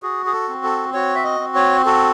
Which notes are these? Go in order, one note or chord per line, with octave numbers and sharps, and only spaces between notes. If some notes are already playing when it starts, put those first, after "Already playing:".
F#4 G#4
G#4
A4
C4
A4
F#4 C#5
E5
D#5
C4
C#5
F#4 A4